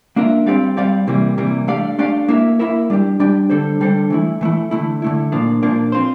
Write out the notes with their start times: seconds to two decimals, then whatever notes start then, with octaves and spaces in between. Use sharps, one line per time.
0.16 A#3 D4 F4 A#4 E5
0.46 G3 C4 G4 D5 F5
0.77 G3 C4 G4 D5 F5
1.07 C3 E3 G3 A#3
1.38 C3 E3 G3 A#3
1.68 A3 D4 G4 D5 F5
1.99 A3 D4 G4 D5 F5
2.28 A#3 E4 A#4 E5
2.59 A#3 E4 A#4 E5
2.90 G3 D4 G4
3.20 G3 D4 G4
3.50 D3 G3 D4 A4 C5
3.80 D3 G3 D4 A4 C5
4.10 E3 A3 E4
4.41 E3 A3 E4
4.71 D3 A3 E4
5.02 D3 A3 E4
5.32 A#2 F3 A#3 D4
5.62 A#2 F3 A#3 D4
5.92 C4 F4 C5